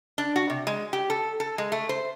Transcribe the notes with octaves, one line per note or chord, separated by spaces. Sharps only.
D4
F#4
C3
G#3
G4
A4
A4
G#3
A3
C5